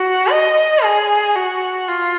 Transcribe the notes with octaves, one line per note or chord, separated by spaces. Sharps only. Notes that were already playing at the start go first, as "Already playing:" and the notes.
Already playing: F#4
D#5
G#4
F#4
F4